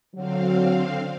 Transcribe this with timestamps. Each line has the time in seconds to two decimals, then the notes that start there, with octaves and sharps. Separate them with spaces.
0.14 D3 F#3 C4 F5